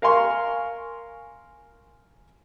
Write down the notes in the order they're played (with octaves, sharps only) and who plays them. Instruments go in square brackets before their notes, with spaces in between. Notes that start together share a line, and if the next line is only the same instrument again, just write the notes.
[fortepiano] A#4 F5 G#5 C6 C#6